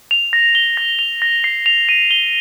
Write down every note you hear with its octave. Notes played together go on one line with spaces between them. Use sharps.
F7
A#6
G7
A#6
F7
A#6
C7
F7
D#7
G7